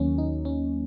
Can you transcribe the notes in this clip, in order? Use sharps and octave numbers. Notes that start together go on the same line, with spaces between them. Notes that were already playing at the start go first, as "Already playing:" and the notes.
Already playing: D#2 D#3 F#3 A#3 C#4
D#4
C#4